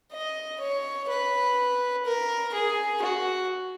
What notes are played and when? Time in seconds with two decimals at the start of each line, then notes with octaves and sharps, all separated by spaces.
0.12 D#5
0.60 C#5
1.09 B4
2.05 A#4
2.54 G#4
3.02 F#4